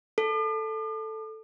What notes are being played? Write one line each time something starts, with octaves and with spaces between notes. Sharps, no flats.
A4